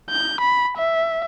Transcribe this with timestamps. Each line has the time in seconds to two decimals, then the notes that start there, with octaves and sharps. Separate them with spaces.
0.10 G6
0.41 B5
0.77 E5